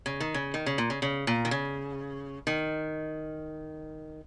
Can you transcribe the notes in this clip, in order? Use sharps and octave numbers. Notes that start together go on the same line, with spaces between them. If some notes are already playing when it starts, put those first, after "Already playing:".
C#3
D#3
C#3
D#3
C#3
A#2
C#3
C#3
A#2
D#3
C#3
D#3